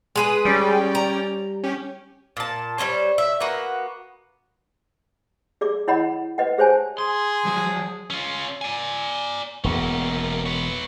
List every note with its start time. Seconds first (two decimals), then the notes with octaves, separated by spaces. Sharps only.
0.16 G#3 G#4 B4
0.45 G3 C#4 D5 G5
0.95 A#5
1.64 C#4 G4
2.37 A#2 A5
2.78 G3 A3 C5 C#5
3.18 E5
3.40 A#3 B3 F#4
5.61 G#4 D5 D6
5.88 E4 C#5 D#5 F#5 B5
6.38 B4 D#5 F#5
6.58 G#4 C5 C#5 G#5 A5
6.98 G#4 C6
7.45 F3 F#3
8.10 C#4 F4
8.61 D5 G#5
9.64 E1 A#3 B3 C#4
10.46 B4 C#5